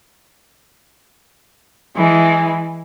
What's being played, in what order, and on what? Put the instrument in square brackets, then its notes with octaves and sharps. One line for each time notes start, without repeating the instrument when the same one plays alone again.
[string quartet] E3 G#3